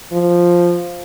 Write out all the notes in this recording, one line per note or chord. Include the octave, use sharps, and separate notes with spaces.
F3